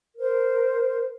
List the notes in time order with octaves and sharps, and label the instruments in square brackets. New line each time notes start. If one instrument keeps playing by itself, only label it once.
[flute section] A#4 C5